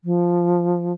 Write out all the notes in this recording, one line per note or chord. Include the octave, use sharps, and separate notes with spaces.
F3